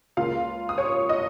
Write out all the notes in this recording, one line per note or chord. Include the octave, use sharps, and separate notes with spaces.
C#2 C#3 A#3 F4 F5
D#6
C#5 C#6
D#5 D#6